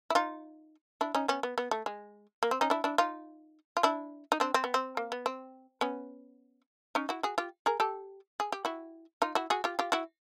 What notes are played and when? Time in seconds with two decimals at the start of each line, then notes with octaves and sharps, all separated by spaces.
0.10 E4
0.15 D#4 F4
1.01 D4 E4
1.15 C#4 D#4
1.28 B3 C#4
1.43 B3
1.58 B3
1.71 A3
1.86 G#3
2.43 A#3
2.51 C4
2.61 C#4 D#4
2.70 D4 E4
2.84 D4 E4
2.98 D#4 F4
3.77 F4
3.83 D4 E4
4.32 D#4
4.40 C4 D4
4.54 C4
4.64 B3
4.74 C4
4.97 A#3
5.12 B3
5.26 C4
5.81 B3 C#4
6.95 C#4 D#4
7.09 E4 F#4
7.23 F#4 G#4
7.38 F4 G4
7.66 G#4 A#4
7.80 G4 A4
8.40 G#4
8.52 G4
8.65 E4 F#4
9.22 D#4 F4
9.35 E4 F#4
9.50 F#4 G#4
9.64 F4 G4
9.79 F4 G4
9.92 E4 F#4